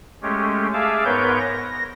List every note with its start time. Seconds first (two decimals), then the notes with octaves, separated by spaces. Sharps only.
0.22 G#3 A3 C#4 G4
0.73 G#4 E5 F5 A5 D6
1.05 G#2 B3 A#4 B4 C#5 G6
1.40 A#6